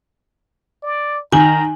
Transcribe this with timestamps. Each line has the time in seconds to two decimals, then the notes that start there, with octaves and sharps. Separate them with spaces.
0.83 D5
1.32 D#3 G#5 A#5 F#7